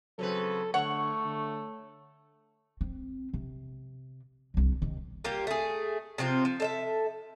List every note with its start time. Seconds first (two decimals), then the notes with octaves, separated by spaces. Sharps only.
0.19 C#3 F#3 C4 A4 B4
0.74 D3 A3 C#5 F#5
1.25 D3
2.81 C4
3.33 C3
4.54 C2 D3
4.82 C3 D#3
5.24 G3 A#3 F4 G4
5.47 A3 G#4
6.18 C3 F3 C4 F4
6.45 F3
6.60 A4 D#5 E5